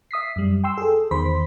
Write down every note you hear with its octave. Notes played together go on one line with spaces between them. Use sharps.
E5 D#6 B6 C7
F#2 G3
G5 C6 E6
G#4 A4
E2 D#3 C5 B5 C6 B6